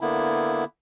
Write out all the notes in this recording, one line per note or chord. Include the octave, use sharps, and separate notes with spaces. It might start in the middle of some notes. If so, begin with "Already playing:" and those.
D3 A#3 B3 E4